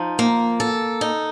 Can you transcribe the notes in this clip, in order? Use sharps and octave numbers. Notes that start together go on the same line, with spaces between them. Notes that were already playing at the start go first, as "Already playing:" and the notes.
Already playing: F3 D#4
A#3
A4
D#4